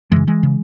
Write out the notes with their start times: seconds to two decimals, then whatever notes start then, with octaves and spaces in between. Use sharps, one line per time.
0.12 F#2 C#3 E3 G#3
0.27 E3 G#3
0.43 C#3